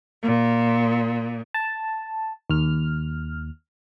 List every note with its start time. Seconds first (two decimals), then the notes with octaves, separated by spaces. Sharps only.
0.22 A#2
1.54 A5
2.50 D#2 F6